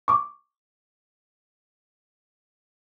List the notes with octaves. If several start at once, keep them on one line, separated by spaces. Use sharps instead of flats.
C#6 D6